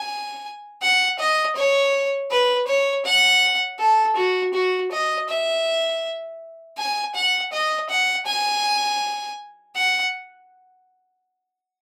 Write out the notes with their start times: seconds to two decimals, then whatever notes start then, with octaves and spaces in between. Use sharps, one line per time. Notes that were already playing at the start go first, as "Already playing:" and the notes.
Already playing: G#5
0.82 F#5
1.19 D#5
1.56 C#5
2.31 B4
2.67 C#5
3.05 F#5
3.79 A4
4.16 F#4
4.54 F#4
4.91 D#5
5.29 E5
6.78 G#5
7.15 F#5
7.52 D#5
7.90 F#5
8.26 G#5
9.76 F#5